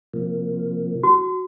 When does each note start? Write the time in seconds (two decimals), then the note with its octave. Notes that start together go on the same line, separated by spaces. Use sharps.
0.14 C3 F3 A#3
1.03 F#4